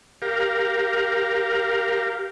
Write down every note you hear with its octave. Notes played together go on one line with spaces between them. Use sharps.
G4 A#4 F5